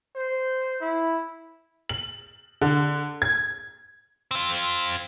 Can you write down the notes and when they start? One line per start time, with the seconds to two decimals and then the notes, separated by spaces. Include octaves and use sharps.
0.15 C5
0.81 E4
1.89 F#7
2.62 D3
3.22 G#6
4.31 C4 F4